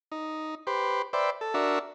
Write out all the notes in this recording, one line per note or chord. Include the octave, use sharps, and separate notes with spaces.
D#4
G4 B4 C5
B4 C5 D5 E5 G5
A4
D4 F#4 A#4 E5